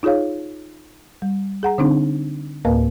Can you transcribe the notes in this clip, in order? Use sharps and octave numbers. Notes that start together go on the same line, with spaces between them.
D#4 F4 G#4 C#5 F5
G3
G#4 F#5 A#5
D3 C4 D4 D#4
D2 A2 A#3 A#4 B4 F5